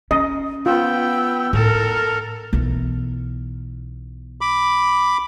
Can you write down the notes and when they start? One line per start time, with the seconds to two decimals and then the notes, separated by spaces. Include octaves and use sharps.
0.11 C#4 D#5
0.66 B3 F4 G5 E6
1.53 A2 A4 A#4
2.53 B1 E3
4.41 B5 D6